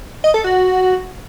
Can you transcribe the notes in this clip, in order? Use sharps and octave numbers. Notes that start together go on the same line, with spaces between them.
D#5
A4
F#4